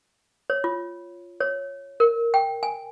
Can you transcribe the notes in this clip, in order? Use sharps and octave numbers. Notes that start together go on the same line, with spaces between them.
C#5
F4
C#5
A#4
G5
G#5